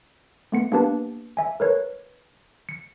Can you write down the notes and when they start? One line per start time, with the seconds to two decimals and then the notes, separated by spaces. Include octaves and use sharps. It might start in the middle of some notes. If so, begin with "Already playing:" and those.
0.52 A3 B3 C#7
0.72 A#3 B3 D4 G4 B4 A5
1.37 E5 G#5
1.60 A#4 B4 C#5
2.69 C#7